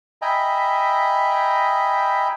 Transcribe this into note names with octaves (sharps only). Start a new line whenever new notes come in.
D#5 E5 G5 G#5 A#5 B5